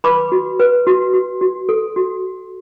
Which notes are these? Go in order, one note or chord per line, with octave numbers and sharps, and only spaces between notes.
B4 B5 D6
F#4
B4
F#4
F#4
F#4
A4
F#4